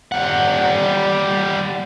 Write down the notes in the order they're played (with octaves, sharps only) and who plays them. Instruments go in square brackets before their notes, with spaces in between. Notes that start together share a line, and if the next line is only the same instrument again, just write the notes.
[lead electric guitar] G3 F#5